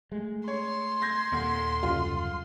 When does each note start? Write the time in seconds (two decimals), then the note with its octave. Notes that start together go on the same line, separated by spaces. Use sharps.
0.12 G#3 A3
0.48 C#5 C6
1.02 G6 G#6 A#6
1.32 D#2 A#2 A4 F#5 G#6
1.83 C2 F#2 C#3 F4